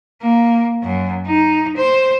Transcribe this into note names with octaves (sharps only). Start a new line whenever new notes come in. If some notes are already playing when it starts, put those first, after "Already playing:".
A#3
F#2
D#4
C5